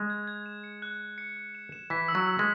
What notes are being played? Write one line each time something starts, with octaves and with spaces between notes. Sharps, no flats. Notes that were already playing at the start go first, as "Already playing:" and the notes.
Already playing: G#3
G#6
G#6
E7
C#7
F#6
F#6
C#7
F#6
E7
E7
E3 B6
E6
F#3
E6
G#3